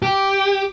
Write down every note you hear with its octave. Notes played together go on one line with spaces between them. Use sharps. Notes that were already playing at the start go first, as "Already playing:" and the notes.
G4